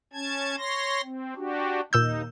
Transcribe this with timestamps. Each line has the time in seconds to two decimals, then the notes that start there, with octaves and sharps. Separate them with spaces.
0.13 C#4 A5 G#6
0.57 C#5 C6 A#6
1.03 C4
1.36 D4 F#4 G4
1.93 D#2 A#2 D#4 E6 G6